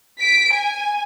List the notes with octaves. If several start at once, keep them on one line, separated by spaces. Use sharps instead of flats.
B6 D7
G#5